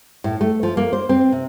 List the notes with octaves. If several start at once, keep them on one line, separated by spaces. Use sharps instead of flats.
A2
A3
F3
A#3
C5
C4
C3